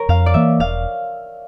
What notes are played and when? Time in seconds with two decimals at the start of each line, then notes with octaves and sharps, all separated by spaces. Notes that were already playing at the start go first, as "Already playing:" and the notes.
Already playing: A#4 C#5
0.09 F2 F5
0.26 D5
0.34 E3 A#3 E5
0.59 E1 F5